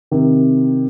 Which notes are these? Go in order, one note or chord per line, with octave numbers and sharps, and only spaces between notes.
C3 D#3